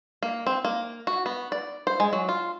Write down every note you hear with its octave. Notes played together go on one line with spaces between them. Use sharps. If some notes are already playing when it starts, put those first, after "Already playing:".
A#3
C4
A#3
F#4
B3
D5
C5
G#3
F#3
F4